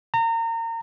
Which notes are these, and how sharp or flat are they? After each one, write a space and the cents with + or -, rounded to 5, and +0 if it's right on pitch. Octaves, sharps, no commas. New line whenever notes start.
A#5 -30